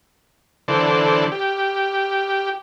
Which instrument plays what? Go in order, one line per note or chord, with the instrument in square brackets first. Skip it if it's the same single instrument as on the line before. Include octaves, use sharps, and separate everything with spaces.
[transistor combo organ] D3 E3 A4 C5 D5
G4